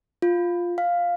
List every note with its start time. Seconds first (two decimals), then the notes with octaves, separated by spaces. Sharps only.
0.22 F4
0.78 F5